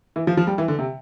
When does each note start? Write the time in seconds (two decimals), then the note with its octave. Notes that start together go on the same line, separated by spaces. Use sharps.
0.16 E3
0.27 F3
0.37 F3
0.47 G3
0.58 E3
0.68 D3
0.79 C3